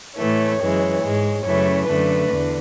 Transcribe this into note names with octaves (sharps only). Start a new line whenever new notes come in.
A2 E3 A3 C#5
F#2 E3 G#3
G#2 G#3
F#2 C#3 E3 A3 C#5
F#2 D3 A3 B4
E2 D3